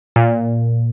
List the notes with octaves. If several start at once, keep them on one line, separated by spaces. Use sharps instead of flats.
A#2